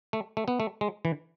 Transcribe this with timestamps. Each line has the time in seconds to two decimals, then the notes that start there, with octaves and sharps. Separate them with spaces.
0.13 A3
0.37 A3
0.48 B3
0.60 A3
0.81 G#3
1.05 E3